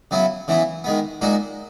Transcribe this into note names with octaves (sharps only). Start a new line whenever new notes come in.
C#3 F#3 B3 E4
C#3 E3 B3 E4
D#3 G#3 B3
A#2 G#3 D#4 F#4